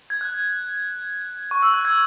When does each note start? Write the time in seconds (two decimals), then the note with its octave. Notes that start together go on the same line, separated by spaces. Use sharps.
0.10 G#6
0.21 F#6
1.51 C#6
1.62 E6
1.74 F#6
1.85 G#6